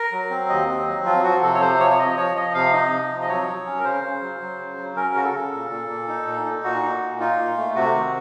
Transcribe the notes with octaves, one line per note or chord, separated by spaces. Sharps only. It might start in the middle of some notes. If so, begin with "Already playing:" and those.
Already playing: A#4
F#3
C4
D#2 D#5
C4
F#3
F3 F4
F3 F#4
C3 A4
C#5
C3 C5
F3 C#5
C#5
F3 D#5
F3 C#5
F3 D#5
C3 F5
D#4 D#5
C3
F3
D#5
F#3 C#5
F#3
C#4
A#4
C#3 C5
C#3
F#3
F#3
C#3
F#3
C#4 A#4
C#3 F#4
A4
C#3
A#2
A#2
A#2
D#4
A#2
D#4
A#2 F#4
D#4
A#2
D#4 F4
A#2
A3
C3 F#4
D#3